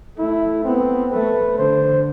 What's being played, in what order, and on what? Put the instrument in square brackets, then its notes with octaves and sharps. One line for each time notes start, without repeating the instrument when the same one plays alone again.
[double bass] A3 [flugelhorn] E4
[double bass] B3 [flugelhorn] C4
[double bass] A3 [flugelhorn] B4
[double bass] D3 [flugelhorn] C5